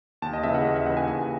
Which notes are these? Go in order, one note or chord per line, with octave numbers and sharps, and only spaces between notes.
D#2 A5
D#5
C#3 E3 E5
F#5
D#2 D#5
E5
C#3 E3 F#5
G#5
D#2 G#5